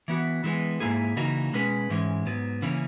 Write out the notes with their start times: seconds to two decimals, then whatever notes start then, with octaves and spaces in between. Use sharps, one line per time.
0.08 E3 B3 F#4
0.44 E3 G#3 B3
0.80 G#2 E3 A#3 E4 G#4
1.16 C#3 E3 A#3 D#4 F#4
1.53 B2 G#3 C#4 G#4 B4
1.90 G#2 E3 G#3 C#4
2.26 G#2 F#3 B3
2.62 C#3 E3 A#3 C#4